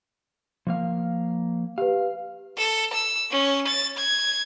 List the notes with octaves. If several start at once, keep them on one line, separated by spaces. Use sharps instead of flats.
F3 A#3 F5
G4 B4 F5
A4
E6
C#4
A6
G#6